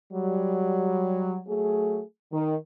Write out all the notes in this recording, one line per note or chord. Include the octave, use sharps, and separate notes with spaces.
F#3 G3
F#3 A3 G#4
D#3